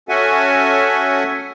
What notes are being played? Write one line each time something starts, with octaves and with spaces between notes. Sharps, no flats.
C#4 F#4 A4 E5 F#5 G#5